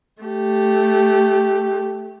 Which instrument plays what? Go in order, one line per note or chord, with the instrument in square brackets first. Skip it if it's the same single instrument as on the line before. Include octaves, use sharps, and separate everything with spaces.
[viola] A3 G4